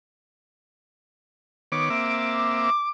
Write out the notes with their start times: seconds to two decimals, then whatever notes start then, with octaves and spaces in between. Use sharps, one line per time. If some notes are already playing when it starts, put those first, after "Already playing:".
1.72 D#3 B3 C#5 D6
1.90 A#3 C4 E5